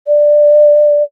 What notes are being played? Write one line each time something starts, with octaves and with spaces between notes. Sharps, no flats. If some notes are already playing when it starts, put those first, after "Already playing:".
D5